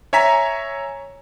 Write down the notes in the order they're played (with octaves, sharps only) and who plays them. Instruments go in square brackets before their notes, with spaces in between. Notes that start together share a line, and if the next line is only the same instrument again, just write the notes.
[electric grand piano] C#5 E5 G#5 A#5 B6